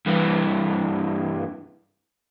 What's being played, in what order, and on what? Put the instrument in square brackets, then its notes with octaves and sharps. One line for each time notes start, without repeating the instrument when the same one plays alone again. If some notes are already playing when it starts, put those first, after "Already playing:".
[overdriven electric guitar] G2 E3